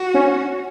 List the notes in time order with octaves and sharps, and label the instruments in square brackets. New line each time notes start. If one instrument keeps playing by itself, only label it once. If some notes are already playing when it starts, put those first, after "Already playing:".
Already playing: [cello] F#4
[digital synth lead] C#4